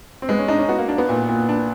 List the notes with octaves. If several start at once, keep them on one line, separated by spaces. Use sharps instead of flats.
C4
G#3 B3
C#4
D4 D#4
C#4
B3 F#4
A#3
A#3 D4
B3
A#2
A#2
D4